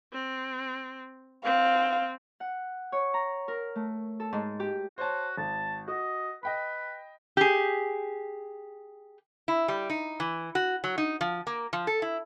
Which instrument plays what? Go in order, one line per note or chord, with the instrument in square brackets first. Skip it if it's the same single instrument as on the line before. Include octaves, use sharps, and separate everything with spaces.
[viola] C4
[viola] C4 [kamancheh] F5
[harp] F#5
C#5
A#5
A#4
A3
A4
G#2
G4
[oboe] F#4 [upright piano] C5 C#5 A5
[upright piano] G#1 [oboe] A5
[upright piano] F#4 [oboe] D#5
[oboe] B4 [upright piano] D#5 G5 B5
[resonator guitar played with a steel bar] G4 G#4
E4
G3
D#4
E3
F#4
F#3
D#4
F3
A#3
F3
A4
E4